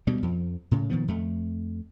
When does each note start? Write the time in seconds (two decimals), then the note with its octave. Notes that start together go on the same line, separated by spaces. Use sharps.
0.07 D2 B2 G3
0.23 F2 F3
0.71 A2 C#3
0.90 A#2 D#3 F3 B3
1.08 F2 A3